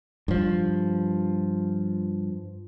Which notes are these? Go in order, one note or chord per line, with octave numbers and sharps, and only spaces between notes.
G2 F3